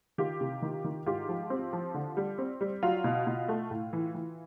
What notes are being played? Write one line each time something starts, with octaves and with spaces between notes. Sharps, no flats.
D#3 F4 G4
C3
D#3
D#3
G#2 F4 G4
F3
C4
F3
D3
G3
C4
G3
F#3 F4
B2
B2
A3
A2
E3
E3